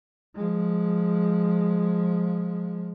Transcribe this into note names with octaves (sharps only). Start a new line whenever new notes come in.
F3 G#3